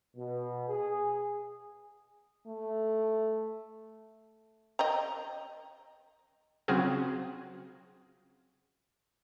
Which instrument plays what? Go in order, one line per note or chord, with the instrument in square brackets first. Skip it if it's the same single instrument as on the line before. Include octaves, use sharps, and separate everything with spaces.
[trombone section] B2
G#4
[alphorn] A3
[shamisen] D#5 G5 A#5
[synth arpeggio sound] C#3 F#3 C4 F4 F#4 G#4